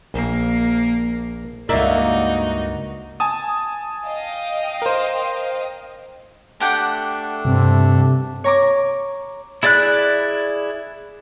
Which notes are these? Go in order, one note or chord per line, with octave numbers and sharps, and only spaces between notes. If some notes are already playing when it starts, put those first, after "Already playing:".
A#1 A#3
C#2 G2 A#3 D#4 F#4 D5 E5
G#5 A5 D#6
D#5 F5 G5
A#4 C5
A3 D4 G4 F#5 G5
G2 C3
C#5 A#5 C#6 D6
E4 G#4 D5 B5 F#6